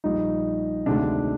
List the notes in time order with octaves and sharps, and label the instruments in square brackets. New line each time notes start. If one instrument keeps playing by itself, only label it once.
[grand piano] A#1 A#2 G3 D#4
D2 C3 D#3 G#3 D4